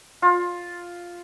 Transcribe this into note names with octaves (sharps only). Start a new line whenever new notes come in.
F4